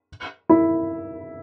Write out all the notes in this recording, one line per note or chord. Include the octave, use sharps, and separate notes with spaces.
E4